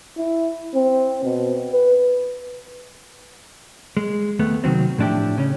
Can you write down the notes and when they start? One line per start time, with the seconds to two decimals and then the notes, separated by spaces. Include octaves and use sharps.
0.18 E4
0.75 C4
1.24 B2
1.72 B4
3.97 G#3
4.39 D#2 A3 B3
4.64 C3 D#3 F#3 C4
4.98 A2 F3 D4 E4 G4
5.38 C#3 C#4